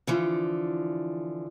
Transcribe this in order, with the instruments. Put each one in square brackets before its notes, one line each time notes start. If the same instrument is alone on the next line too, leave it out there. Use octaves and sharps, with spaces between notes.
[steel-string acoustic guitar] D3 E3 F3